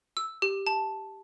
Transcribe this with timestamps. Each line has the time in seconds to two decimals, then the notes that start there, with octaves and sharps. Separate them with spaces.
0.17 E6
0.42 G4
0.67 A5